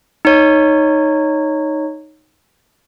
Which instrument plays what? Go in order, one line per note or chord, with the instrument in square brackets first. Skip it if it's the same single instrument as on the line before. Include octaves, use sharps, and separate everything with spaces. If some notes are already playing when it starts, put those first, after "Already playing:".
[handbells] D#4 C#5